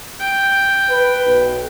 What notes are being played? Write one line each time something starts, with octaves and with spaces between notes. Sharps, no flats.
G5
B4
B1